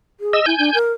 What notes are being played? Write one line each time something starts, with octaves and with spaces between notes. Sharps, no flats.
G#4
D#5 E6
E4 G#5 G6
D4
A#4